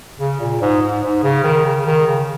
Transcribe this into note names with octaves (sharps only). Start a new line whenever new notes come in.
C#3
A#2
G#2
G#2
G#2
C#3
D#3
C#3
D#3
C#3